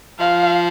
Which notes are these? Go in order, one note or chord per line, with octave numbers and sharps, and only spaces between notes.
F3 F5